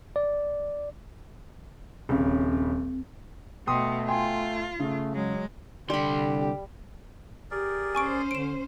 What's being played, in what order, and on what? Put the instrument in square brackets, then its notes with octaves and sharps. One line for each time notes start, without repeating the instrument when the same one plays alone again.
[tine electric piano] D5
[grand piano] D#1 C#3 [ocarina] C4
[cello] B2 [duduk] A3 [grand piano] G5 C6 D#6
[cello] F4 [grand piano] G5 G#5 C6
[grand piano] C#3 [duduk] A3
[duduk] F#3 [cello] G#3
[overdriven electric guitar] C2 C6 [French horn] D3 [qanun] G3 B5 [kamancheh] G4
[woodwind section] G4 [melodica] G#4 A#4 D5
[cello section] C#4 C5 [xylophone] G#5 C#6 D7
[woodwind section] D3 [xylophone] D7 E7